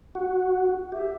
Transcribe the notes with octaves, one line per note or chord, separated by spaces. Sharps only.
F#4
G4 E5